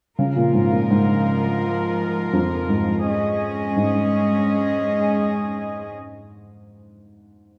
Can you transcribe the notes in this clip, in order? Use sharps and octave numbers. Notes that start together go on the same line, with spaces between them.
C#3 F3 G#3 F4 A#4
A#2
G#2
A#2
G#2
F2
G#2
G#3 C#4 G#4 D#5
G#2